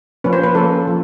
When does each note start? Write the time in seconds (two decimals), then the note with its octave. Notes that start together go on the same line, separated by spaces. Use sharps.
0.24 F3 A#3 C#4 B4
0.33 C5
0.44 B4
0.55 F3 A#3 C#4 A4
0.87 F3